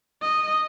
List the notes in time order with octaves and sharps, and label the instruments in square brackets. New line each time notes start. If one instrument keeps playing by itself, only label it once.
[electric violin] D#5